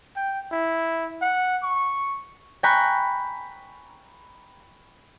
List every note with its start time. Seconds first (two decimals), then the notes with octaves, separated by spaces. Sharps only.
0.16 G5
0.52 E4
1.22 F#5
1.63 C#6
2.63 G5 G#5 A#5 B5 C#6 F#6